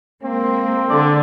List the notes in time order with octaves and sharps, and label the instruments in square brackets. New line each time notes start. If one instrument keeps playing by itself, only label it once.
[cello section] G#3 A#3 [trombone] C4
[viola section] D3 [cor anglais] D5